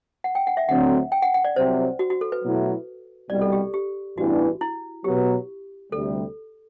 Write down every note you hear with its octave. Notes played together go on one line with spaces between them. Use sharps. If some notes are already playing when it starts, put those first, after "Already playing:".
F#5
G5
F#5
E5
D2 D3 F#3 C4 F#5
G5
F#5
F#5
D5
C2 C3 F#3 C4 C5
F#4
F#4
A4
B4
B2 F#3 A3 E4
C2 B2 G3 D5
A4
G4
G4
A1 G2 E3 B3 D4 F#4
E4
B2 F#3 B3 G4
D2 C3 G3 A4